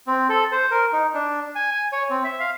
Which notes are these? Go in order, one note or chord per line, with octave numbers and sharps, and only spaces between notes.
C4
A4
C5
A#4
D#4
D4
G#5
G#5
C#5
C4
E5
F5